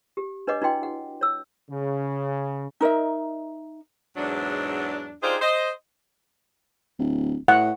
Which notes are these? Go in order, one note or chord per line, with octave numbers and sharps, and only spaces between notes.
G4
D4 B4 C#5 D#5 F#5 D6
D4 E4 F#4 D#5 G5 C6
F#5
C#5 E6
C#3
D#4 A#4 D#5 E5
E2 G#2 F#3 D4
D4 D#4 F4 G4 G#4 C5
C5 D#5
D1
A2 F#5